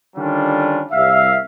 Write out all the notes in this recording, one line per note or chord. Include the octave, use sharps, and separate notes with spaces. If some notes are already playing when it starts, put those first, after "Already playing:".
D3 D#3 G3 C#4 D4 F4
C2 E5 F5